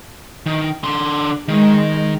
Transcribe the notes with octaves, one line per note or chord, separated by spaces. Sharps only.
D#3
D3 C6
D#3 G#3